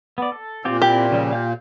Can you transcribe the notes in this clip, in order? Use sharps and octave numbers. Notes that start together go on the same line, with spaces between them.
B3 D5
A4
A#2 C4 F4 G4
C4 E4 G4
C#3 F3 G3
F5 G6